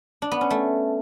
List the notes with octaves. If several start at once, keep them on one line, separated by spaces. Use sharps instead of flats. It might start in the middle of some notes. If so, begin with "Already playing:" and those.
D4
B3
C#4
A3